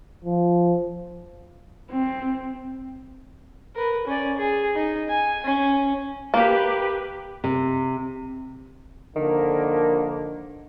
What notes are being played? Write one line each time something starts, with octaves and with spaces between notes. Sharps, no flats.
F3
C4
A#4 B4
C#4 D5
G#4
D#4
G#5
C#4
A#3 G4 B4
C3
D3 D#3 F3 A#3